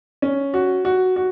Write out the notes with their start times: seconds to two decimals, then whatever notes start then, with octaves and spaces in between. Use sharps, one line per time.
0.22 C#4
0.54 F#4
0.85 F#4
1.16 F#4